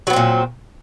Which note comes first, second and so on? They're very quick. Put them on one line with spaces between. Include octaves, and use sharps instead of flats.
F#3 B3 C4 A#2